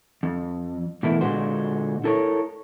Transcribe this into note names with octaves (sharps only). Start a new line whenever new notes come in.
F2
B2 E3 A3 A#3 E4
A#2 D3 G#3 F#4 C5
E4 A4 A#4 C#5